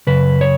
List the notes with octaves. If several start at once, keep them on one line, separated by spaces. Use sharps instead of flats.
F#2 C#3 B4
C#5